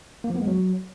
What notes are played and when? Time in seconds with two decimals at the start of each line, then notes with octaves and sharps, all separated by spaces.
0.24 A#3
0.30 F3
0.36 B3
0.41 G#3
0.47 F#3